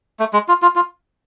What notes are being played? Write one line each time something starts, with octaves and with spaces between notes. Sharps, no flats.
A3
G#3
F4
F4
F4